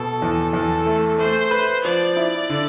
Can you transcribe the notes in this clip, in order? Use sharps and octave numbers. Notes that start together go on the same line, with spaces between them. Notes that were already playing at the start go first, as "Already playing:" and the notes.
Already playing: B2 A4
E2
E2 A4
A3
A3 C5
B4
F3 D5
E4
D3